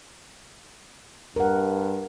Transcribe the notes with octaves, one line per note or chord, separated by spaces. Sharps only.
G2 A#4 F#5